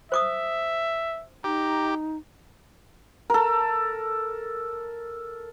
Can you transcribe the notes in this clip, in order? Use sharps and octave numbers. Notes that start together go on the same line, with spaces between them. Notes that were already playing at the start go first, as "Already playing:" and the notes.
C5 E5 D6 D#6
D#4 G4 A#5
A4 A#4